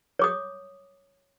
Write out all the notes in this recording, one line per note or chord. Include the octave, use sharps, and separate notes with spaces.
C#5 D6 D#6